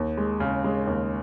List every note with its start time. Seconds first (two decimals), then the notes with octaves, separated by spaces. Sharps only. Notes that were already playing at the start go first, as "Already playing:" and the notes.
Already playing: D#2
0.17 G#3
0.40 C#3
0.64 G#3
0.87 D#2